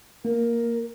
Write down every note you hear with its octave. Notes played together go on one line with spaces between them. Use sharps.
A#3 A#4